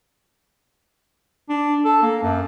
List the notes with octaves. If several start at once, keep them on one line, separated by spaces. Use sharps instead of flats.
D4
A4
A#3
F#2